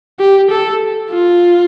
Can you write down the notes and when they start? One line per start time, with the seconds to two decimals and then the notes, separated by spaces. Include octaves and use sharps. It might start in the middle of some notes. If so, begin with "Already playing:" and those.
0.19 G4
0.51 A4
1.11 F4